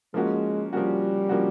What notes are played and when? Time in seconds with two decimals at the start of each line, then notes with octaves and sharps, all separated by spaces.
0.14 F3 G#3 A#3 C#4 F#4
0.72 F3 G3 A#3 C#4 F#4
1.29 F3 A#3 C#4 F#4